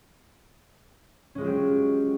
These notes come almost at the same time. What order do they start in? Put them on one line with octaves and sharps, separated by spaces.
C#4 G#3 F4 F#3 G4